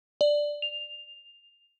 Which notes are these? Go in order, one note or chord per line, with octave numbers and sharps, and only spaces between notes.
D5
F7